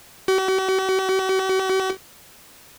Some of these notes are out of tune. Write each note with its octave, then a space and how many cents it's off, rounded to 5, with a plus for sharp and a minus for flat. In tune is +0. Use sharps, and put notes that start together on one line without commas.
F#4 +45